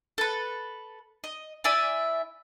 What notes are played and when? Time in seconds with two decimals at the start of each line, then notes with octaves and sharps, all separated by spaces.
0.18 A4 B4
1.24 D#5
1.64 E4 D5 E5 G#5